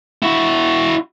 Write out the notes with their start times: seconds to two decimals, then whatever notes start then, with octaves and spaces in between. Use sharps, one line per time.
0.22 E4 F#4